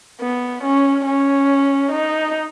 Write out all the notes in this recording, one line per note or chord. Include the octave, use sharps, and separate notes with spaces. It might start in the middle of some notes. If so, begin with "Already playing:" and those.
B3
C#4
C#4
D#4